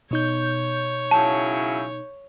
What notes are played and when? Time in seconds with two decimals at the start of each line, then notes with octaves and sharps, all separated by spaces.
0.11 B2 D#4 C#5 G6
1.11 C#3 F#3 E4 A5